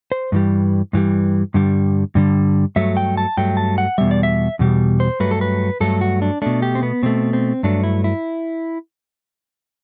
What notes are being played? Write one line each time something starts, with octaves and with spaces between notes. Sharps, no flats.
C5
G2 E3 G3
G2 E3 G3
G2 D3 G3
G2 D3 G3
G2 F#3 A3 E5
G5
A5
G2 F#3 A3 G5
A5
F#5
E2 B2 G3 E5
D5
E5
E2 B2 G3
C5
G2 F#3 A3 B4
A4
B4
G2 F#3 A3 A4
F#4
D4
B2 A3 D4
G4
C4
B3
B2 A3 C4
C4
G2 F#3 A3 D4
E4
E4